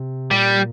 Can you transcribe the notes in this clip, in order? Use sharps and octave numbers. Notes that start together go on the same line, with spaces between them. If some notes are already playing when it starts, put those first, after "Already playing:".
Already playing: C3
A#2 G3